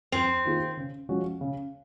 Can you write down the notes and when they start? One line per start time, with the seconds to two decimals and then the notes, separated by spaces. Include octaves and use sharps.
0.12 F2 C4
0.45 D#3 A#3 F4 G#4
0.77 C#3
1.09 F3 G#3 C#4 F#4
1.41 C#3